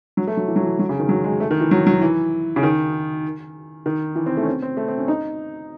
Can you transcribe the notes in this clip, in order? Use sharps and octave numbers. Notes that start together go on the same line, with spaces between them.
F#3
A3
F#3
E3
F#3
E3
F#3
C#3
D#3
F#3
G#3
A3
D#3
E3
F#3
F#3
E3
C#3
D#3
D#3
E3
C4
A3
C#4
C4
C4
A3
C4
C#4
D#4